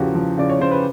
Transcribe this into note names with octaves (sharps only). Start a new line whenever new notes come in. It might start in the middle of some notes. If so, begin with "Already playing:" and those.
Already playing: E2 C#3 F3 F#4 G4
F3
C#3 D5
C#5
C#3 C5
B4